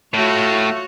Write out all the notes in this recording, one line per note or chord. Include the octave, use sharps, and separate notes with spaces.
A2 A3 F4 F#4 C#5